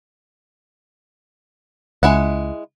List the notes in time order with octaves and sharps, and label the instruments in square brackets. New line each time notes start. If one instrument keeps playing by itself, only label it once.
[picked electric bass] C#2 [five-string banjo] G#3 E4 F#5